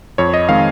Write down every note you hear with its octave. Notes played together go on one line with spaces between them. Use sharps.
F2 C#5
D#5
D#3 G#3 C4 F5